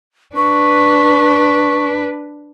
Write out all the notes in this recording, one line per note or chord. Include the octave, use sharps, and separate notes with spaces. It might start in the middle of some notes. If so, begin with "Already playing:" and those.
D4 B4 C#6